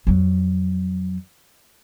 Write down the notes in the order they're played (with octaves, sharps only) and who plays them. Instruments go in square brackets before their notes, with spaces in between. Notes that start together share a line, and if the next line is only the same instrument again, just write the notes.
[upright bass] F2 F#3